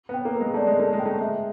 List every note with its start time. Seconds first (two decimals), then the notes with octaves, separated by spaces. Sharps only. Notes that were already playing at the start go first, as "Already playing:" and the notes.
0.09 B3
0.14 G5
0.25 A#3
0.35 A#4
0.41 G#3
0.54 A3 D5
0.67 G#3
0.78 A3 A#4
0.93 G#3
0.99 G5
1.06 A3
1.19 G#3 E5